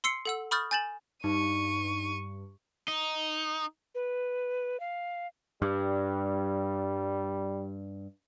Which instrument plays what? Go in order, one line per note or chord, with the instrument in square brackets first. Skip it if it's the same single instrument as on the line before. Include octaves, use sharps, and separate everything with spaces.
[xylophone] C6 E6 C7 C#7
A4 F#5 E6
B5 C#6 D#6 F6 G6 A6
G#5 G6 A6 E7 F#7
[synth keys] G2 [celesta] D#4 [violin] C#6 D#7
[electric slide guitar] D#4
[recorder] B4
F5
[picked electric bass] G2 [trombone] G3